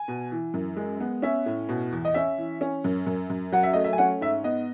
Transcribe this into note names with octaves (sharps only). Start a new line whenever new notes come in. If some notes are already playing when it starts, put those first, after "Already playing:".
Already playing: G#5
B2
E3
F#2
G#3
B3
C#4 E5
A2
B2
E2
D#5
C#4 E5
E3
C#4
F#2
F#2
F#2
F#3 F#5
E5
A3 D#5
E5
G#5
C#4 F#5
G#2 E5
B3 D#5